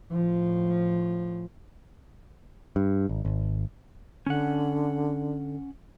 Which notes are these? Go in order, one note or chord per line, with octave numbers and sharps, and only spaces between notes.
A2 F3
G2
G#1
G#1
D3 C#4 F#5